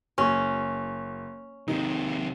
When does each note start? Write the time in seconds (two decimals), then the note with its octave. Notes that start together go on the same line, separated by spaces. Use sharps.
0.18 F#1 C#4
1.68 C3 D#3 D#4